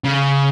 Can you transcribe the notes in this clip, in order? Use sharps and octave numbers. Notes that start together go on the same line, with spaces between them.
C#3